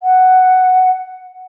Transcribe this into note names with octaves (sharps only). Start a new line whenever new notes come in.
F#5